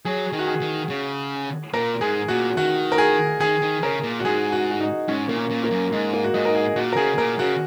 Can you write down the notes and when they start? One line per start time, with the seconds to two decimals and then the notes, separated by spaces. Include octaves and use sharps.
0.05 F#3 G#4
0.33 D#3
0.39 F#4
0.47 G#4
0.61 D#3
0.90 C#3
1.73 A#2 A#4
2.01 G#2 G#4
2.28 A#2 F#4
2.57 D#3 F#4
2.92 A#4
2.98 G#4
3.40 D#3 G#4
3.62 D#3
3.82 C#3 A#4
4.03 A#2
4.20 F#4
4.25 G#2 G#4
4.52 F#4
4.71 F#4
4.80 D#4
5.08 G#2 C#4
5.28 A#2 A#3
5.36 C#4
5.51 A#2
5.64 A#3
5.71 F#2
5.92 G#2 G#3
6.13 A#3
6.24 F#4
6.34 G#2 D#4
6.45 A#4
6.55 G#4
6.76 A#2 F#4
6.92 A#4
6.97 C#3 G#4
7.18 A#2 A#4
7.39 C#3 F#4